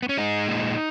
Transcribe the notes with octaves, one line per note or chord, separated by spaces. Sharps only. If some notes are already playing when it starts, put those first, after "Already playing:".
B3
C#4
G#3 D#4
A#2